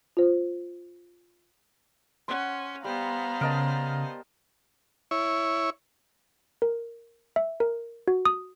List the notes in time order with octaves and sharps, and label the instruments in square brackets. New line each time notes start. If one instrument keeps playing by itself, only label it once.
[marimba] F4 C5
[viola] C#4 [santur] F#5 C6
[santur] G3 [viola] B3 C5 [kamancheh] F5 A#5
[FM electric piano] C#3 [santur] A#4 D#5 A5
[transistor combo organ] E4 C#5
[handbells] A#4
E5
A#4
F#4
D#6